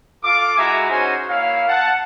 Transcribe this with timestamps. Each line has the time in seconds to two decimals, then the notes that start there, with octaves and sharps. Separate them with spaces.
0.23 F4 A4 F5 D6
0.57 G#3 E4 F#4 E5 G#5 A#5
0.89 C#4 D#4 F#4 G#4 C5 G#5
1.28 A#3 E4 C#5 F5
1.68 F#5 A5